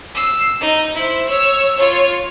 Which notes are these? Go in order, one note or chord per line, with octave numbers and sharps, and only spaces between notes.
E6 C7
D#4
E4 C5
C#5 E6
F4 C#5